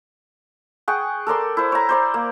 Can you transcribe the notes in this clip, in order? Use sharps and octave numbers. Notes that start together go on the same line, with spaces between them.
G#4 F#5 G5 C#6
A4 A#4 D5 C6
E4 C5
C#5 A#5
C5 D5 C6
A#3